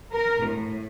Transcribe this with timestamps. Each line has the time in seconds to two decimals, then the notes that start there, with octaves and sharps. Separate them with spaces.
0.12 A#4
0.44 A2